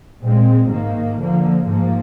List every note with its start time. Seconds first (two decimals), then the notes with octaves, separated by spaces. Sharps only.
0.21 A#2 G#3 C4
0.70 G#2 D#3 A#3
1.18 D3 F3 A#3
1.67 G#2 F3 A#3